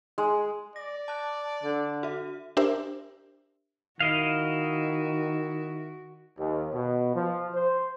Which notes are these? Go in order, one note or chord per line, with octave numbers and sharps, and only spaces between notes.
G#3
D5 A#6
A5 F#6
D3
F#4 E5
D4 G4 A#4 C5 E5
D#3 E4 F#4 D#5 F5
D#2
B2
F3
C5